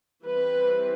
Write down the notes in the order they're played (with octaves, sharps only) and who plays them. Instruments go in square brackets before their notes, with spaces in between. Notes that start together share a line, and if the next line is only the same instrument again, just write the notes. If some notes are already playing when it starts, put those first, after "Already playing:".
[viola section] E3 G3 C4 B4